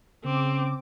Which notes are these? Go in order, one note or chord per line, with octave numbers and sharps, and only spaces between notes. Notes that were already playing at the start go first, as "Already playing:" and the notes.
C#3 C4 D6